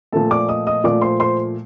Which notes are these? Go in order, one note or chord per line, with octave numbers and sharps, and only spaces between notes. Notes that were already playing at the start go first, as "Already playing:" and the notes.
A#2 F3 A3 A4 A5
D5 D6
D#5 D#6
D#5 D#6
A#2 F3 A3 D5 D6
C5 C6
C5 C6